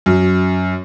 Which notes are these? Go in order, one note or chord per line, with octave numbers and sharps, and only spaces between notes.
F#2